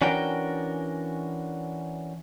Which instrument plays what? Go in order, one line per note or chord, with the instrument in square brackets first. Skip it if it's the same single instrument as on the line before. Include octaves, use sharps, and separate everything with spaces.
[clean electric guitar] E3 C#4 D4 F#4 A#4 G5